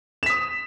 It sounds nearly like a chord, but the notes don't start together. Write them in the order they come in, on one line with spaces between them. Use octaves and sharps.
E7 B6 D#6